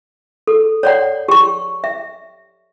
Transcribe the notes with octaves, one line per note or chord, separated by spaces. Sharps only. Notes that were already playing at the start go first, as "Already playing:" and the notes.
A4
C#5 D5 F#5
G4 C#6
E5